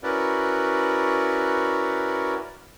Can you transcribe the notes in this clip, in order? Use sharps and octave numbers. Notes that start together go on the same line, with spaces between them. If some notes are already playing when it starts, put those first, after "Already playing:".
C#4 E4 F#4 A#4 B4 D5